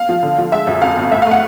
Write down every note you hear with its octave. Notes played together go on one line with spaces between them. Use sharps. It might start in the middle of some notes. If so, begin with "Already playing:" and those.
Already playing: F5
F3
D3
F3
G#3 E5
F#2
F2 F5
G1
A2 E5
F5
A3 F#5